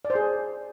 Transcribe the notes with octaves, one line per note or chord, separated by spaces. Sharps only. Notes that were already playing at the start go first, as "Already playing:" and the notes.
D5
C5
G#4